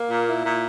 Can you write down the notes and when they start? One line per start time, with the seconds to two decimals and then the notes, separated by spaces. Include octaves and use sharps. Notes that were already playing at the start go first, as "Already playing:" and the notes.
Already playing: A#3
0.10 A#2
0.27 E4
0.44 A#2